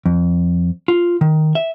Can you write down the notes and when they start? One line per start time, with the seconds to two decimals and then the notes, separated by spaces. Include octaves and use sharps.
0.06 F2
0.88 F4
1.21 D#3
1.55 E5